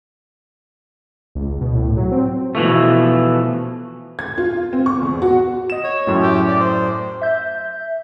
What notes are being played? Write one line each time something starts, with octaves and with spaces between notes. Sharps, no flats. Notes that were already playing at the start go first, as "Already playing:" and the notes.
C#2
B2
A2
F#3
C4
B2 E3 F3 A3
G#6
F4
C4
C#6
E2
F#4
D#5 E7
C#5
F#2 A2
G4
D5
C5
E5 G6